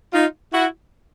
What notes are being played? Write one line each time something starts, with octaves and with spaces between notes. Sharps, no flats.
D#4 F4
E4 F#4